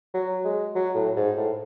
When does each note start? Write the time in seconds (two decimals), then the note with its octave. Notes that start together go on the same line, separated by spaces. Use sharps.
0.14 F#3
0.44 G#3
0.75 F#3
0.95 A2
1.16 G#2
1.36 A2